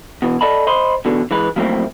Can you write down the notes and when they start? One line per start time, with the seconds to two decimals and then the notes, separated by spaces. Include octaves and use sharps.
0.22 B2 E3
0.41 A4 D5 D#5 A5 B5
0.67 C5 D#5 B5 C6
1.05 E2 B2 D3
1.31 E3 G#3 B4
1.56 F3 F#3 A3 A#3 C4 E4